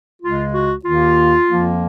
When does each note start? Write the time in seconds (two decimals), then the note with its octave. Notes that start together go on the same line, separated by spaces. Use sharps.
0.22 C#2 C#3 G#3 F4
0.54 F#4
0.85 D#2 D#3 A#3 F4
1.47 F2 F3 A#3